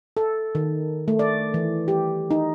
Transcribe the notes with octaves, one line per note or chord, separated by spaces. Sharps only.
A4
D#3
A3
D5
E3
G4
D#4